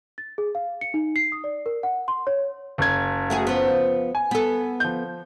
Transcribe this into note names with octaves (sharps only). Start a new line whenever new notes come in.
A6
G#4
F5
C#7
D#4
C7
D#6
D5
A#4
F#5
C6
C#5
F#1 G#6
A3 F#4 G#4
F3 B3
G#5
B3 A4
F3 G6